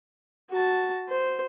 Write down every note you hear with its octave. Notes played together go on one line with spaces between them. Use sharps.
F#4 A5
C5